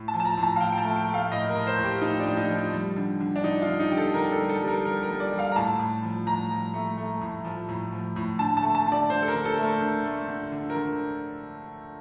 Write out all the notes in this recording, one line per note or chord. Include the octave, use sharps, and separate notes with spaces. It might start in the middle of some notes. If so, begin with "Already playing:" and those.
Already playing: A2
A5
F3
A5
A#5
A2
A5
F5
F3 G5
G5
A5
A3
G5
A3
F5
A2 D#5
A#4
A2
C5
A2
G4
F3 D#4
D4
A2
D#4
F3
G3
D3
D3
D4
D3 D#4
F4
D3
D#4
D3 G4
A4
D3 A#4
A4
G3
A4
G3
A#4
D3 A#4
A#4
G3
D5
G3
F5
A#5
A2 A5
A2
F3
A2 A#5
F3
A3
A3
A2
F3
A2
F3
A2
D3 A5
A5
A3
A5
D3
D5
D3 C5
A4
A#4
D3
A4
A3 A#4
D3
A3
D3
D3
A#4
D3